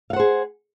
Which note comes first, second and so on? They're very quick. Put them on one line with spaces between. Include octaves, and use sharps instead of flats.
F5 F#5 C5 G#4